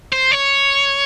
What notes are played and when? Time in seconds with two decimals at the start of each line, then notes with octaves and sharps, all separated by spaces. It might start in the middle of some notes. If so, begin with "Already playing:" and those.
0.12 C5
0.31 C#5